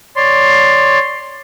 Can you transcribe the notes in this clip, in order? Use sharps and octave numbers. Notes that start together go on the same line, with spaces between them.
C#5 D5 C6